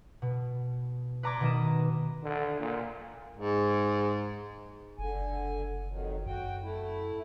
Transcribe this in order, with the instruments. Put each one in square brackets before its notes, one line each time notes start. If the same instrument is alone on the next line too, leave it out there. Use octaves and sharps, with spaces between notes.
[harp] B2
B4 D5 A#5 C6 D6 G#6
B2 D#3 D#5 E7
[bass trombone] D3
A#2
[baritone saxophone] G#2
[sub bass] F#1 [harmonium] D3 G#5
[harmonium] F2 D#3 F#3
[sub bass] F#2 [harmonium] F#4 G5
[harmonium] A3 E4